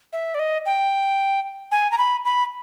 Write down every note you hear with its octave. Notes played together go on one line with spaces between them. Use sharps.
E5
D5
D#5
G5
G#5
A#5
B5
B5